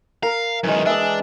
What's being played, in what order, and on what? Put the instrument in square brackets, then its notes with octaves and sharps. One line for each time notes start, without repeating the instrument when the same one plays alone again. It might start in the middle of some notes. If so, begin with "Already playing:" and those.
[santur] A#4 [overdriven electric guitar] F5
[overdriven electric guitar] F#2 D#3 [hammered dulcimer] E3 G#3
[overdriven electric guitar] D4 [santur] E5 D#6